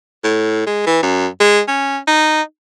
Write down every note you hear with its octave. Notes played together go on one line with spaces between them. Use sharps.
A2
G#3
E3
F#2
G#3
C#4
D#4